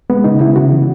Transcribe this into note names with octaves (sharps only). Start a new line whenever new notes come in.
G#3 B3
C#3 D#4
C#3 E4
C#3 F#4
E3